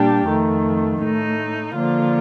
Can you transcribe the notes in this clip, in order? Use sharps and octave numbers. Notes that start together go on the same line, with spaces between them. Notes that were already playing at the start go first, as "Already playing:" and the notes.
Already playing: A#2 G3 D4 G4
F2 D#3 A3
A2 A3 D#4
D3 F3 A#3 F4